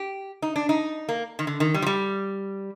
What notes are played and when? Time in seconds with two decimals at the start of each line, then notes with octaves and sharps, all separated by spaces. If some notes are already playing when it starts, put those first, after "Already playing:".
Already playing: G4
0.42 D#4
0.56 D4
0.69 D#4
1.09 A#3
1.39 D#3
1.47 D3
1.60 D#3
1.74 G3
1.82 F3
1.86 G3